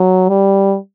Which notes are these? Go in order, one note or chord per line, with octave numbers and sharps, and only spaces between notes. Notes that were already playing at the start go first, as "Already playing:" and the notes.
Already playing: F#3
G3